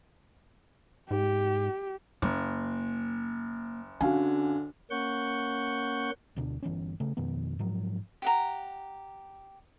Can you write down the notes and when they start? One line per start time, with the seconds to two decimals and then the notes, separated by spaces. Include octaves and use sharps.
1.11 G#2 G4
2.22 F#1 A#3
4.01 D3 C#4 F#4 F5 G#5
4.90 A#3 C#4 F#5 C#6 G6
6.36 D2 B2 C4 D4
6.62 G1 E3 B3 C#4
7.00 C#3 A3
7.17 F2 B2 D#3 B3
7.59 G#2 F3 F#3
8.22 G4 F#5 A#5